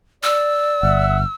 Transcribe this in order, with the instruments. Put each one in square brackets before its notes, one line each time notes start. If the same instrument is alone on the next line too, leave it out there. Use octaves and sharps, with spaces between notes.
[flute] D5 [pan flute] E6
[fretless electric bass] G1 [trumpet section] E5 F#5